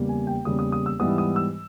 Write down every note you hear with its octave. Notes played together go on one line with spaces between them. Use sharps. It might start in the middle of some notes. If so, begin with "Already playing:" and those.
Already playing: E2 C#3 G3 A#3
G#5
G5
E2 C#3 G3 A#3 D#6
D#6
D#6
E6
G#2 E3 G3 B3 D#6
D#6
E6